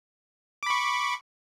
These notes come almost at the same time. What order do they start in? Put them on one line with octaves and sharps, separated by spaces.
D6 B5 C#6